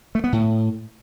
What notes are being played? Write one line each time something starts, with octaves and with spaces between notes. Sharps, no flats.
A3
B3
A2